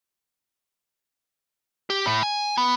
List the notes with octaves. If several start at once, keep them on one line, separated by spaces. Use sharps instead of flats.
G4
A2
G#5
B3